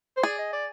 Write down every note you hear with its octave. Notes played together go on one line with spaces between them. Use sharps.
C5
G#4 D5
D#5
D5